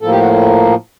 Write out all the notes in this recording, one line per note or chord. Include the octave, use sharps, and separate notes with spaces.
A2 F3 A#3 A4
G4
F#4